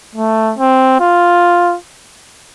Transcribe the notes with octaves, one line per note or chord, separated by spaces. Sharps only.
A3
C4
F4